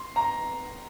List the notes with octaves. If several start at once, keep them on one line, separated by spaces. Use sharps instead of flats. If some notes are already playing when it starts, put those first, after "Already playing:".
Already playing: C6
A#5